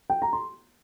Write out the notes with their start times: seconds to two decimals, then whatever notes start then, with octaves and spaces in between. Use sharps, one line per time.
0.10 G5
0.22 A#5
0.33 C6